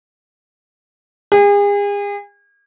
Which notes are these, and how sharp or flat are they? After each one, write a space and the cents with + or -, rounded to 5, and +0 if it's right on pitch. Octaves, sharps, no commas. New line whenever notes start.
G#4 -40